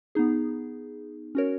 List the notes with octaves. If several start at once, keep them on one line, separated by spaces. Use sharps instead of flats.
B3 D#4 G#4
C#4 F#4 A#4 C#5